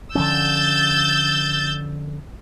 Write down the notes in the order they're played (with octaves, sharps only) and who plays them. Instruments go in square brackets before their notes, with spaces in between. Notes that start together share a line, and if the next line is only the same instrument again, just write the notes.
[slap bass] D3 F3 C#4 [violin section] E6 G6 A6